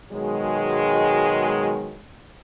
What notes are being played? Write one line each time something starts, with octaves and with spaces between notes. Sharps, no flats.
B2 D#3 F#3 G#3